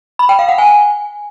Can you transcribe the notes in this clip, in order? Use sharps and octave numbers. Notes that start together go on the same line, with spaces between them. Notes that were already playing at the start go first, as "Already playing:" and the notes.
B5
G5
F5
F#5
G#5